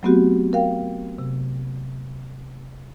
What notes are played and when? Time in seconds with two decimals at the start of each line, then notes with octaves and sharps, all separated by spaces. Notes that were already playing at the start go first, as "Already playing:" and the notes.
0.03 F#3 A3 B3 C4 F#4 G4
0.53 A#4 F5 G5
1.19 C3